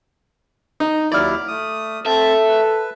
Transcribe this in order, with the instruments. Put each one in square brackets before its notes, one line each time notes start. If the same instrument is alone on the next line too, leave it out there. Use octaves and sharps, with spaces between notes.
[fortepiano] D#4
[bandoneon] D#2 F#3 E4 [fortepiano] D5 F6
[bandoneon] A3 D#6
[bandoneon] C4 A5 [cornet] A4 [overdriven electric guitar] E5
[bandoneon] B4